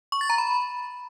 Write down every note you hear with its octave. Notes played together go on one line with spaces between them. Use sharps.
C#6
A6
A#5
B5